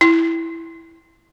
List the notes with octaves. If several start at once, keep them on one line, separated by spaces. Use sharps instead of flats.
E4